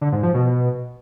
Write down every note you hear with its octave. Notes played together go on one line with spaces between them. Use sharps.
D3
G#2
F3
B2